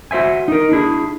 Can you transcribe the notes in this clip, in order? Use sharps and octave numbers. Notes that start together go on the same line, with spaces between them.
F#4 C5 E5 G#5
D#4 A#4
D4 E4 G#4